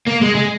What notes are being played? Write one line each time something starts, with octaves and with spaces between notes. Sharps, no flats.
A#3
G#3
G#3